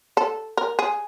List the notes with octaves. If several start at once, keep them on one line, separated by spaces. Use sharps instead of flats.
A4
A#4
G#4